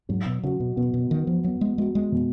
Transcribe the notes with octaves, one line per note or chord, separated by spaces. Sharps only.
G#2 F#3
B2
C#3 F#4
B2
B2 B3
B2
D#3 B3
F3
F#3 B3
G#3
G#3 F#4
G#3
B2